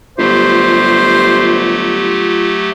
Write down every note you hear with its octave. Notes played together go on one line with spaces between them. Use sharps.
G1 F#3 A3 F4 G4 C5